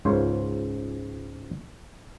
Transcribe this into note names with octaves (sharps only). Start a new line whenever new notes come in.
C#2 G#2 F4 A#4 C5 C#5